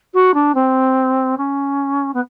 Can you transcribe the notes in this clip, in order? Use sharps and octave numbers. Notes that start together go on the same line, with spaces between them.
F#4
D4
C4
C#4
B3